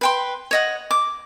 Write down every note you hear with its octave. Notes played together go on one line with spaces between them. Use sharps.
B4 G5 C6
C#5 D#5 F#5
D6